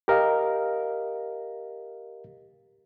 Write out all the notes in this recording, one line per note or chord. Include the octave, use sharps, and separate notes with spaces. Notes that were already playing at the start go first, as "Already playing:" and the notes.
G4 A#4 D#5 F5